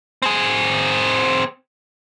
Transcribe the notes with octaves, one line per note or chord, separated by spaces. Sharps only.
C4 G#4